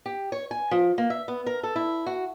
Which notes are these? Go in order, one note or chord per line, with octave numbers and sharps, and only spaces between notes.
G4
C#5
G#5
F3
A#3
E5
B3
A#4
A4
E4
F#4